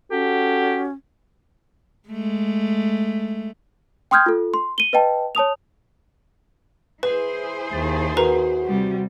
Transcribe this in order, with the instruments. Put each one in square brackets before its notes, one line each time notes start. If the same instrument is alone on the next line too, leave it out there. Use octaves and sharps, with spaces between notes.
[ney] C#4 [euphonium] F#4 [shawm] G4 [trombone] A4
[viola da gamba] G#3 A3
[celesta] G5 C6 D#6 F6 G6 G#6
F4 A4
C6
D#7 G7
B4 D#5 G5 A5
C#5 A5 D#6 F7
[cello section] E4 G#4 C5 [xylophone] B4
[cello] D#2 [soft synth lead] A6
[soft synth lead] F#4 [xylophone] A#4 B4 A#5
[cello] C3 G3